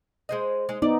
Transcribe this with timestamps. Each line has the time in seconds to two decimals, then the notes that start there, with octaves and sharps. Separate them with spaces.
0.29 G#3 C5 D#5
0.69 G#3 D#4
0.82 B3 D#4 D5